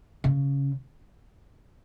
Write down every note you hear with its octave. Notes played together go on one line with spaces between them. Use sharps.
C#3